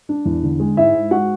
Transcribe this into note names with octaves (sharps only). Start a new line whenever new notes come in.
D4
E2
D3
G#3
G#2 E4 E5
G#2
G#3 F#4 F#5